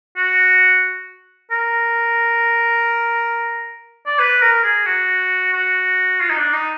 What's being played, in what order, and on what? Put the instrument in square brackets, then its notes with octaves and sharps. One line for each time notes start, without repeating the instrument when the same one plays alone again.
[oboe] F#4
A#4
D5
B4
A#4
G#4
F#4
F#4
F4
D#4
D4
D#4